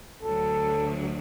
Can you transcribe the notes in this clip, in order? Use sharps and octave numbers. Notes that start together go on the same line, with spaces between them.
D2 D3 F#3 A4